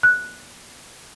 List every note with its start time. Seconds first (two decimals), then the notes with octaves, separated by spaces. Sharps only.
0.03 F#6